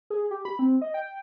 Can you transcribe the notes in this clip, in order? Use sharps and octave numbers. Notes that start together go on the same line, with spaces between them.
G#4
G4
B5
C4
D#5
G5